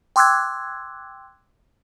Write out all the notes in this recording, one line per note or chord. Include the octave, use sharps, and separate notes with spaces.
G5 C6 D6 E6 F#6 G#6